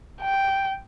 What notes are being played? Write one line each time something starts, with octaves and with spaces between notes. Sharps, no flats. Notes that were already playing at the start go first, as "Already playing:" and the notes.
G5